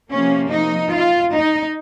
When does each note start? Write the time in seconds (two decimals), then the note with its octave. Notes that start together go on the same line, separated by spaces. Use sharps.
0.11 C3 F3 A#3 C#4
0.51 D#4
0.92 F4
1.32 D#4